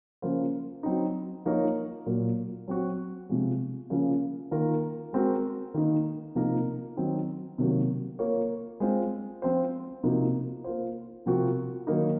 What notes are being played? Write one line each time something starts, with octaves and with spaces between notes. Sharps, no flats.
C#3 F3 A#3 F4 C5
F#3 C4 D#4
F3 A#3 D#4 A#4 C#5
A#2 F#3 A#3
F#3 C4 F#4
C3 F3 G#3
C#3 F3 A#3
D#3 A#3 F4 A#4
G#3 C4 F#4 A#4
D#3 A#3 D#4
C3 F3 A#3 D#4 A#4
D#3 F#3 C4 D#4
C3 D#3 F#3 A#3
A#3 F4 A#4 C#5
G#3 C4 F4 C5
F3 C4 F4 C5
C3 F3 A#3 D#4 F#4
A#3 F4 C5
C3 F3 C4 F#4 A#4
D#3 F#3 A#3 D#4